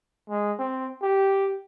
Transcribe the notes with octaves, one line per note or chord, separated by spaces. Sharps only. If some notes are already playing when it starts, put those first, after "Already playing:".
G#3
C4
G4